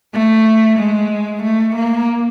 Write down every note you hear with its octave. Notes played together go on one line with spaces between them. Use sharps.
A3
G#3
A3
A#3